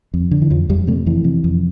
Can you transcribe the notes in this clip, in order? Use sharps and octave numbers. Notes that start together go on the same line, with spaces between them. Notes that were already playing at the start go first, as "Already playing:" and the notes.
F2
D3
E3
F2 F3
F2 G3
C3 A3
F2 E3
C3
F2